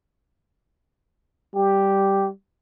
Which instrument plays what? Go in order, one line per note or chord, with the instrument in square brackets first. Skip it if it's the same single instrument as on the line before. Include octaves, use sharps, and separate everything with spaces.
[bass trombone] G3 [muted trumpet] G4